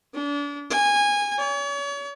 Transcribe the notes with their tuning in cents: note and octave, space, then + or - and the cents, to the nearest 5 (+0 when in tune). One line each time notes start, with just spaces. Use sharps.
D4 -35
G#5 -20
C#5 +40